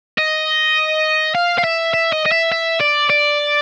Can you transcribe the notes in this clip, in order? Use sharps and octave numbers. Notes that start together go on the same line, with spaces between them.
D#5
F5
F5
E5
E5
D#5
D#5
E5
E5
D5
D5